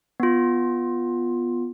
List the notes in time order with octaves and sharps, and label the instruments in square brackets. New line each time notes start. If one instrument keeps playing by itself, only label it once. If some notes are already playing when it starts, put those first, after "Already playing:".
[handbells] B3 F4